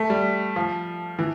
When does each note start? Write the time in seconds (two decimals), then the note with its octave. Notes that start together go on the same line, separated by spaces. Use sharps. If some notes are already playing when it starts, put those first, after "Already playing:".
Already playing: A3
0.10 G3
0.56 F3
1.19 E3